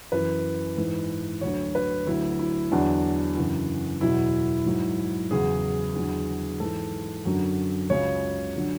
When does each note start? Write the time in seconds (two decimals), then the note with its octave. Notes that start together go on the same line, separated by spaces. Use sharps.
0.12 F#2 E3 B4
0.77 G#2 E3
1.41 D2 D3 F#3 C#5
1.75 B4
2.07 D2 D3 F#3 E4
2.39 E4
2.71 E2 D3 F#3 D4
3.36 F#2 C#3 E3
4.01 E2 B2 F#3 E4
4.66 G#2 F#3
5.31 E2 C#3 F#3 G#4
5.95 E2 D3 F#3
6.60 G#2 E3 A4
7.25 F#2 D3 F#3
7.90 C#2 C#3 F#3 C#5
8.56 D3 F#3